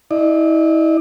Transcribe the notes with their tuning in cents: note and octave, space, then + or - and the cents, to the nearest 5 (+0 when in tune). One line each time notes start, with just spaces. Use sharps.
E4 -35 D5 +45